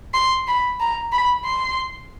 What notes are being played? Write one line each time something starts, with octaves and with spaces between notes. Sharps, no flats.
C6
B5
A#5
B5
C6